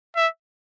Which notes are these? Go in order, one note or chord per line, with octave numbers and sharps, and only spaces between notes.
E5